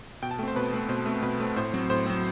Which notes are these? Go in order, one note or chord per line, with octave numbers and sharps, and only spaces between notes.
B2 G5
A5
A3 C4 C5 G5
B2 B4
A3 C4
B2 C5
A3 C4
B2 B4
A3 C4
A2 C5
F#3 C4
A2 C5
F#3 C4